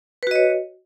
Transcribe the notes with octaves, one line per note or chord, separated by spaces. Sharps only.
F#4 B4 C#5 D#5